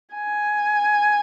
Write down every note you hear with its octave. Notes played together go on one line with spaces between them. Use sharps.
G#5